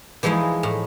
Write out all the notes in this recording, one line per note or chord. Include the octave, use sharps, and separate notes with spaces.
E3 F3 G#3 D#4 E4
A2